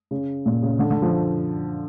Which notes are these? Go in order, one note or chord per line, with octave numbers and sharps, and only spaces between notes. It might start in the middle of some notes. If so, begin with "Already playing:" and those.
C#3
A#2
C#3
D3
D3
F3